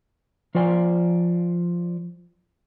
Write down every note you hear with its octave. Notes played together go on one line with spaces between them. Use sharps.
F3 F4 C5 D5 G#5